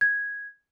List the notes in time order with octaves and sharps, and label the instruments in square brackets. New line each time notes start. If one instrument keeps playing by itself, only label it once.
[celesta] G#6